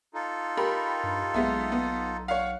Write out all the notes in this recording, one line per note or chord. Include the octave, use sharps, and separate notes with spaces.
D#4 F4 A4
G4 A#4 B5
G2
B1 G#3 B3 E5
B3
C#5 F5 F#5